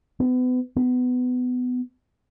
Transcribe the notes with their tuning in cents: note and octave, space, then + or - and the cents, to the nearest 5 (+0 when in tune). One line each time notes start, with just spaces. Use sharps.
B3 +35
B3 +20